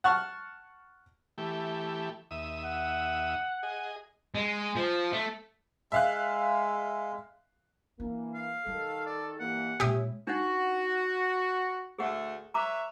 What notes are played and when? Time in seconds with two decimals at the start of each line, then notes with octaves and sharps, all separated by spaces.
0.04 F#5 A5 C#6 F6
1.38 E3 A3 G4
2.31 D#2 E5 D#6
2.65 F#5
3.63 G#4 D#5
4.35 G#3
4.76 F3
5.12 A3
5.92 G#3 E5 F5 F#6
8.00 E3 A#3 D4
8.34 F5
8.67 D#3 G3 A4
9.06 D5
9.40 G2 E3 A#3 F#5
9.80 A#2 G#3 C#4 E4 G4 C#5 D#6
10.27 D4 D#4 F#4 F#5
11.99 D2 A3 G#4 F#5
12.54 B4 C#5 E5 A#5 D6